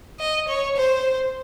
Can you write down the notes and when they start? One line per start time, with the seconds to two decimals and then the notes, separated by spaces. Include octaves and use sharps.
0.20 D#5
0.48 C#5
0.77 C5